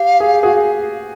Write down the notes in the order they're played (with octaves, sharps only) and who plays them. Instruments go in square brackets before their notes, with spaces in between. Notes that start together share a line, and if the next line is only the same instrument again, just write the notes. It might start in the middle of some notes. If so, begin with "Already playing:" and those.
Already playing: [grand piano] G4 [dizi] F5
[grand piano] G#4
F#4 G#4